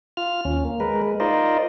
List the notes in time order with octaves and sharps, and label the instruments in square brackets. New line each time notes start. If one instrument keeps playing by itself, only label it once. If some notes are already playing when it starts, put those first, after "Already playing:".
[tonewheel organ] F4 F6
D#2 C#4
A#3
G#3 A#4 B4
G#3
D#4 F4 A#4 C5 D5 D#5